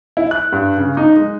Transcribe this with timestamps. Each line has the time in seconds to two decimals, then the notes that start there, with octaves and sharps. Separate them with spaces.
0.17 E4
0.31 F#6
0.52 G2
0.78 C#3
0.97 D#4
1.17 G#3